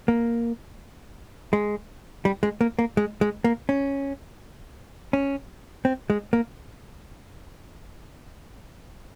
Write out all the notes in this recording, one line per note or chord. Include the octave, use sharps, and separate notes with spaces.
A#3
G#3
G3
G#3
A#3
A#3
G#3
G#3
A#3
C#4
C#4
C4
G#3
A#3